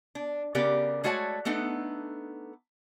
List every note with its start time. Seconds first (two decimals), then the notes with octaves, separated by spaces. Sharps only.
0.15 D4
0.55 C#3 B3 G4 A#4 D5
1.04 G#3 A3 F#4 C#5 D5 A5
1.45 A3 B3 D4 D#4 A4